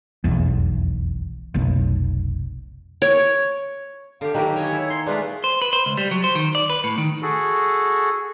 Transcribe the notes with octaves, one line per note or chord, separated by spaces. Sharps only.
F1 B1 E2
F1 B1
C#5
D3 G4 F5
D#3 F#3 A#3 G4 A#4 B4
C#5 D#5 G#5
E4 C#5
D#4 C6
G#3 A3 B3 D4 F4 B4
C5
B4
C5
C#2
G3
F#3
C5
D#3
D5
B4
A2
D#3
F#4 G#4 A4